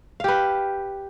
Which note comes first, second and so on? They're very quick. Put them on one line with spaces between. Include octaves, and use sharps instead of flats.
F5 G4 B4